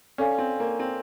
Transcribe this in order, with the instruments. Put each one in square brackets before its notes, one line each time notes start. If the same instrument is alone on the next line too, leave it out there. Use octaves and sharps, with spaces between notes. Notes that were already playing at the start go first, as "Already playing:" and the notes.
[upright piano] C#4 [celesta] A4 D5 F5 G#5
[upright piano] C4
A#3
C4